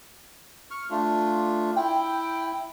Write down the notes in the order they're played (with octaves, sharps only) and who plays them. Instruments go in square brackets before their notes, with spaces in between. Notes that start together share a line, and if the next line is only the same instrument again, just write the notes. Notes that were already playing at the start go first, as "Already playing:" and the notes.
[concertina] C#6 F6
A3 D4 F4
[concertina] E4 [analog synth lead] G5